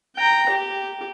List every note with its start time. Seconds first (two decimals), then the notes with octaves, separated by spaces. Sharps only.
0.17 G5 A#5
0.49 G4